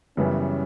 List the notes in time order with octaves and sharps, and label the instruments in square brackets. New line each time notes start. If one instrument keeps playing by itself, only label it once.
[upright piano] F#2 C#3 E3 G3 B3 [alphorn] C#4